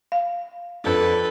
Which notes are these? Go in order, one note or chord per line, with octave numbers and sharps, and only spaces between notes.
F5
F2 D4 A4 B4